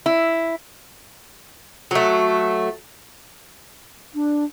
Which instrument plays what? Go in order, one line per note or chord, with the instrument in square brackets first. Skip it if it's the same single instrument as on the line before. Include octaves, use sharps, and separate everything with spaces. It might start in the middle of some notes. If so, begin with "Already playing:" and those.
[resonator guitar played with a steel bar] E4
[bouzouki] F#3 A3
[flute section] D4